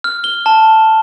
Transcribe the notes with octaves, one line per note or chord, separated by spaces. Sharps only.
F6
G7
A5